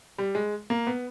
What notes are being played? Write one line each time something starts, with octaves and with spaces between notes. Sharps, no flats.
G3
G#3
A#3
B3